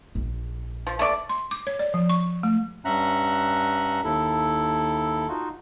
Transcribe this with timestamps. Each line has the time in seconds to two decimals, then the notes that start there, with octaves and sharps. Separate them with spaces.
0.15 A#1
0.87 F3
0.99 A3 D5
1.29 C6
1.51 D6
1.67 C#5
1.79 D5
1.94 F3
2.09 C#6
2.43 A3
2.85 G2 C#4 E5 F#5 A#5 F#6
4.04 D#2 E4 A4
5.29 D#4 F4 F#4